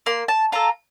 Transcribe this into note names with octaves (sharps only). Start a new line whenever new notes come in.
A#3 C6
A5
F4 A4 A#5